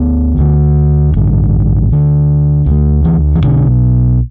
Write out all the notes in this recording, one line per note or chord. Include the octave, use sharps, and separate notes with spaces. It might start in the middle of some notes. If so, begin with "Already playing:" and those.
Already playing: D2 D3 B3
D2 D3
A1 G2 D3
D2 D3
D2 D3
E3
E3
B1 B2 D3